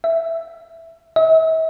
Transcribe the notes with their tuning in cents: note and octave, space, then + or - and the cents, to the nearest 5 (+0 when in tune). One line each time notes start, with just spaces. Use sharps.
E5 +5
E5 -40